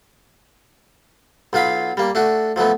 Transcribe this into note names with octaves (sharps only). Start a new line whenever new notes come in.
B1 F#3 F4 F5 B5
G3 A#3
A3 D4 F#4
F3 F#3 A3 B3